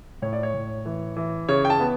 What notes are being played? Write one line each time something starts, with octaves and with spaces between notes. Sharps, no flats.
A2 C#5
D5
C#5
A2
E3
E3
C#3 C#5
G5
A5
B3